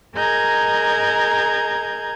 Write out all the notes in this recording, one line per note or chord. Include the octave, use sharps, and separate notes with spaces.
G#4 A#4 D#5 A#5 G6 G#6